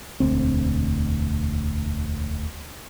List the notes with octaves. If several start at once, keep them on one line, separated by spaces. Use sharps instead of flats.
E1 D2 C4